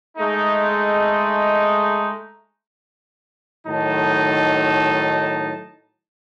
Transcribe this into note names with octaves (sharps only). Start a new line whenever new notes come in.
G#3 A3 D#4
A2 D#3 F#3 D#4 A5